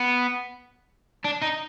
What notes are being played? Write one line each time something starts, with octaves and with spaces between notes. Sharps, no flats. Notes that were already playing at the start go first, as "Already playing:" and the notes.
Already playing: B3
D4
D#4